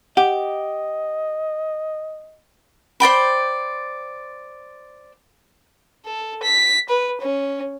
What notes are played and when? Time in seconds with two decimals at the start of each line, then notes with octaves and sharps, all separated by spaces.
0.17 G4 D#5 F#5
3.00 C5 D5 G5 B5
6.05 A4
6.42 B6
6.89 B4
7.21 C#4